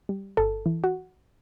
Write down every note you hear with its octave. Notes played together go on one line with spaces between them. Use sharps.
G3
G1 A4
E3
F#4